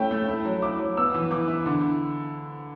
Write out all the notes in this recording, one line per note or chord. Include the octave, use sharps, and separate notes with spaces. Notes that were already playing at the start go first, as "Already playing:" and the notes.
Already playing: A3 C#4 E4 G5
A3
E4
F#3
E4 D6
F#3
B3 E6
E3
E3 D6
E4
D3